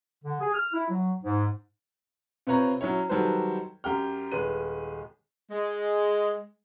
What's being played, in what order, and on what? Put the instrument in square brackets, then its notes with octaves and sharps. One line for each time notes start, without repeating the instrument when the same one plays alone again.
[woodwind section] D3
G#4
F6
E4
F#3
G#2
[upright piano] C3 C4 F4 B4 C#5 A#5
F#3 C#4 E4 C#5
D#3 F#3 G3 A4 B4 C5
F#2 G4 G5 F6
D#1 G#3 B4 D#7
[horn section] G#3